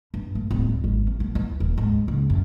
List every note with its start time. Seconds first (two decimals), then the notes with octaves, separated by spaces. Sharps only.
0.14 G2
0.35 A3
0.51 D1
0.69 G3
0.84 G#1
1.07 E3
1.20 A#1
1.35 E3
1.60 D#1
1.78 G#2
2.08 C#2
2.30 F#2